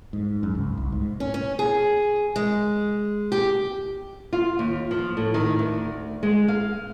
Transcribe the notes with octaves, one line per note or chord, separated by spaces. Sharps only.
G#2
F#2
C#2
C2
G#2
C#4
C#4
G#4
G#3
G4
F4
D#2
F3
A2
D#3
D2
G#3
F5